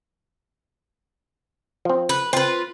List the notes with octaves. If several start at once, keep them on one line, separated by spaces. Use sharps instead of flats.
F3 C4
B4
C4 F4 B4